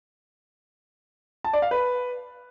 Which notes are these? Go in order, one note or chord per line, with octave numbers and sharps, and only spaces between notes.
A5
D5
F5
B4